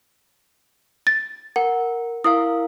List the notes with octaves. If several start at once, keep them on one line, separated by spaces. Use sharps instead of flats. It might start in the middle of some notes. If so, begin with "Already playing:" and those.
A6
A#4 F#5
E4 A#4 F5 D#6